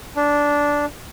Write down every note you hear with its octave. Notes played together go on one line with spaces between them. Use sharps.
D4